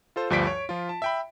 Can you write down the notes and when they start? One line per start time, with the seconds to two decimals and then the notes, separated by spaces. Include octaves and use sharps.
0.16 F4 A4 C5
0.30 D2 G2 F3 D5 B6 D7
0.47 C#5
0.69 F3 F4
0.89 A5
1.02 E5 G5 B5